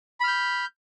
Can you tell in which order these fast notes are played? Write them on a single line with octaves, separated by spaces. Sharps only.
B5 F6 G6